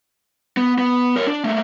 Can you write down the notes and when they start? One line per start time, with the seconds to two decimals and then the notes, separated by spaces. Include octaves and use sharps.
0.57 B3
0.78 B3
1.16 A#4 C#5
1.27 D4
1.45 A3 A#3